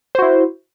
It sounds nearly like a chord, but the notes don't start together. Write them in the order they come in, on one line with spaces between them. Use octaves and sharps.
C5 F#4 E4